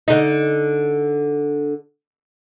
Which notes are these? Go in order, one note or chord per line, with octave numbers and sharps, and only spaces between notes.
D3 D#4